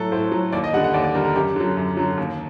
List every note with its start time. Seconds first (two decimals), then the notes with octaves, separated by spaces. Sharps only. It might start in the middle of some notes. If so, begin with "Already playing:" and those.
Already playing: A2 F#3 A4
0.12 A2 C5
0.32 F#3
0.53 D#2 D5
0.64 D#5
0.73 D3 G3 F#5
0.84 F#5
0.93 D#2 D5
1.04 D5
1.14 D3 G3 A#4
1.25 A#4
1.36 F#2 G4
1.56 D3 F#3
1.77 F#2
1.97 D3 F#3
2.17 D#2